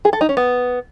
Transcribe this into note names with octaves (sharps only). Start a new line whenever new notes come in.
G#4
A4
D#4
C#4
B3